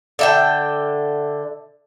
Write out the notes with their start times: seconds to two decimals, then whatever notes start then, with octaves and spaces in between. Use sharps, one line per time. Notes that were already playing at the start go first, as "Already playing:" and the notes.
0.19 D3 E5 G5